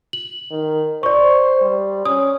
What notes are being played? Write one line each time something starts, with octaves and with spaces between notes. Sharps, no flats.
F#7
D#3
C5 D5 C#6
G3
C#4 D#6